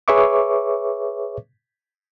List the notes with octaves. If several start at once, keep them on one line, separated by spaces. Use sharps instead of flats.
G#4 B4 C#5 E5 C#6 D6